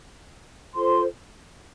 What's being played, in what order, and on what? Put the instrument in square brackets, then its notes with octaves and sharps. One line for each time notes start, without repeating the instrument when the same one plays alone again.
[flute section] F4 A4 C5 C6